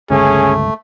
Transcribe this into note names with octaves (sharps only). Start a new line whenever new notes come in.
G1 C#2 A3 C#4 G#4